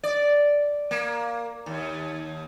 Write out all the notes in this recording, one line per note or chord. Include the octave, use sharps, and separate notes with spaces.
D5
A#3
D#2